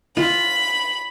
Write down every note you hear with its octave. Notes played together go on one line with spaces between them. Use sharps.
F4 B5